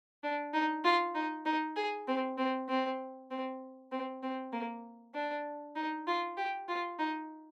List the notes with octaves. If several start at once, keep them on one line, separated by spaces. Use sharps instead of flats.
D4
D#4
F4
D#4
D#4
G#4
C4
C4
C4
C4
C4
C4
A#3
D4
D#4
F4
G4
F4
D#4